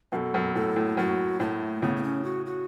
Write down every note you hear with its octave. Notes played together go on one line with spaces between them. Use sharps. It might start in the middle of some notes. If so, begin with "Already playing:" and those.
F#2 B2 A4 B4
F#2 B2
A2 A4
A2
F#2 F#4
A2 A3
A2 C#3 B3
B3
C#4
F#4
F#4